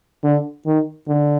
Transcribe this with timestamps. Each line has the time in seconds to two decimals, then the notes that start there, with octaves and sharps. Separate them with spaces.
0.24 D3
0.66 D#3
1.08 D3